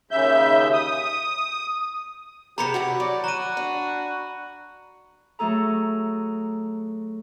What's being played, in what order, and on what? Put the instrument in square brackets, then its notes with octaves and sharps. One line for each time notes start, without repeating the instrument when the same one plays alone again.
[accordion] D#2 C#3 E5 G6
D#6
[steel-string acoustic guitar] C3 B3 G#4 [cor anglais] G4 [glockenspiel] A#5 B5 C#7
[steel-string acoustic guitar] A#2 E4 F#4
[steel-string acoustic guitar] F#3 [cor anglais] D5
[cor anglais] F#4 [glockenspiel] A#5 D#7
[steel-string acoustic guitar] D4
[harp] F#3 A3 G#4 A4 A#5